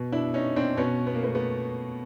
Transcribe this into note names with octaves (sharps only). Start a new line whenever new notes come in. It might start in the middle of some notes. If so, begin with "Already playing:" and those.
Already playing: B2
D4 E4
C#4 D#4
C4 D4
B2 B3 C#4
B3
A#3
A3 B3
A3 B3